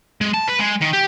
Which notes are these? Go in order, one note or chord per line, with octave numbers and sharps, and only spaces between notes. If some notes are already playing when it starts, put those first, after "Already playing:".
G#3
A5
B4
G#3
D#3
G4